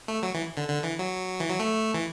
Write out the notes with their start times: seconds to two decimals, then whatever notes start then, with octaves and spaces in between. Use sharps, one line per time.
0.08 A3
0.23 F#3
0.35 E3
0.57 D3
0.68 D3
0.83 E3
0.99 F#3
1.40 E3
1.50 F#3
1.60 A3
1.94 E3